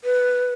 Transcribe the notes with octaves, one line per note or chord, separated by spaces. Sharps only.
B4